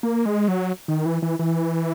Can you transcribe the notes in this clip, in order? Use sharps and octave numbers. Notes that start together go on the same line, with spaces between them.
A#3
G#3
F#3
D#3
E3
E3
E3